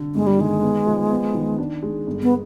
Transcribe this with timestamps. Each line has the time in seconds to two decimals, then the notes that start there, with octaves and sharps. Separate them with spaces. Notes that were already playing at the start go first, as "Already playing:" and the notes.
Already playing: D3
0.15 G1 G#3
0.27 G3
0.38 D#3 G#3
0.62 B3
0.86 F3
1.11 B3
1.34 D#3
1.58 D4
1.82 G#3
2.07 G1
2.23 B3